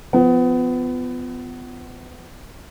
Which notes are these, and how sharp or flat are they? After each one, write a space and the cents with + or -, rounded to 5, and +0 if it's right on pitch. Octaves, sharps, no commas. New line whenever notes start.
F3 +0 B3 +25